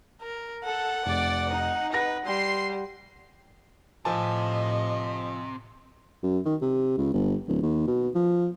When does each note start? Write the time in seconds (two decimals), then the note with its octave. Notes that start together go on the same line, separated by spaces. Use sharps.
0.22 A#4
0.65 A4 F#5
1.06 F1 D5
1.51 D#4
1.93 B4 F#5 A#6
2.26 G3 C6 C7
4.05 A2 C3 F3 D#5 G#5 A5
6.23 F#2
6.45 D#3
6.62 C3
6.98 C#2
7.14 G1
7.48 D1
7.62 D#2
7.87 B2
8.15 F3